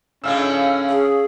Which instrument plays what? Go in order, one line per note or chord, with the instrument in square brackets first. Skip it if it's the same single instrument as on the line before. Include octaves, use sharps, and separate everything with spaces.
[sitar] A2 D3 G#3 [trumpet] C#4 [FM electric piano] F5 E6
[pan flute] G#4